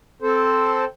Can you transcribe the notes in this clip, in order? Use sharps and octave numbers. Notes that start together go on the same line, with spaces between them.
C4 A4 C5